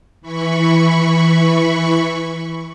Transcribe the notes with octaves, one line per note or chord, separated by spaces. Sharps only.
E3 B5 C#6